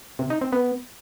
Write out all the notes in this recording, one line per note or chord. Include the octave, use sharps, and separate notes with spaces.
C3
D#4
C4
B3